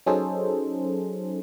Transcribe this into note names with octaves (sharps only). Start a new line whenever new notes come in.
F#3 C#4 D#4 G#4 A4 C5